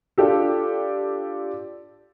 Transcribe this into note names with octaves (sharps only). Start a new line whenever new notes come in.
D4 F4 G4 A4